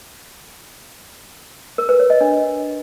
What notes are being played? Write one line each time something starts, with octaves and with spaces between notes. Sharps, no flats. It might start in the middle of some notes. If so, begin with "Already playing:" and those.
A#4
B4
C#5
D#5
D4